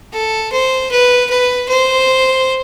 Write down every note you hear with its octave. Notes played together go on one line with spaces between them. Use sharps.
A4
C5
B4
B4
C5